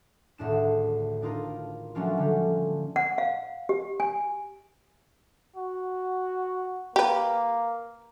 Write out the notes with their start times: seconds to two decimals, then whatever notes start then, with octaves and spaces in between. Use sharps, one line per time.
0.38 G#1 D2 A2 D4 E7
1.22 D4 D#4 F4 A#4
1.95 F3 F#3 A3 C#4 D4 F4
2.17 D3 G3 C#4
2.96 F#5
3.18 F5
3.69 G4
4.00 G#5
5.56 F#4
6.96 A#3 G4 B4